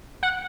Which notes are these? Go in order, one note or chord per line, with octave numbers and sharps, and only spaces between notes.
F#5